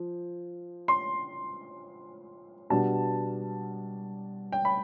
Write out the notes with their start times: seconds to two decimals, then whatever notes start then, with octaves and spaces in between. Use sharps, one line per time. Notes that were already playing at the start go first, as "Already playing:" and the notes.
Already playing: F3
0.88 C6
2.70 B2 G3 B3 D4 A5
4.52 G5
4.65 B5